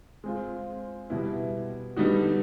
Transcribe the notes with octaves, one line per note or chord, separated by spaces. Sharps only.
G#3 C4 F4
B2 G3 B3 E4
D3 G3 B3 D#4 F#4